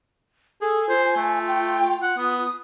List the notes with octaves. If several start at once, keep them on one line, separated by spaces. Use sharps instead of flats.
G#4 A4 G#5
F4 C5
A3
G5
F#5
B3 D#6